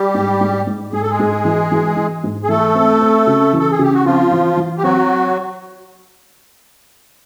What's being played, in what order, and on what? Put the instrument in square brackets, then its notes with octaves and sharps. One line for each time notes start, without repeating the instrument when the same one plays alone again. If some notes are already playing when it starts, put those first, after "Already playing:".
Already playing: [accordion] G3 G4
[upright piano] G#2
G#2
G#2
[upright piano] G#2 [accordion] G#4
[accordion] A4
G#3 G#4
[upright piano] G#2
E3
E3
E3
G#2
[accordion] G#4
[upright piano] E3 [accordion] A3 A4
[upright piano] C4
C4
C#3
E3
[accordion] A4
G#4
[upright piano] C#3 [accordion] G4
[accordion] F#4
[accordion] F3 F4 [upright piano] C4
[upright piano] E3
E3
[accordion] G4
[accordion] F#3 F#4 [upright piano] C4